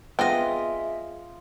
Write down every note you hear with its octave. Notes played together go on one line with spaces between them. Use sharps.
B3 C4 F4 G#4 D#5 E5 G#5